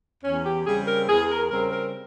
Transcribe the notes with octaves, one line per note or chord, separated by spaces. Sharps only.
E2 C#4
G4
C#3 G3 C4 G#4
A#4
E2 G#4
A#4
C#3 G3 C4 A#4
A#4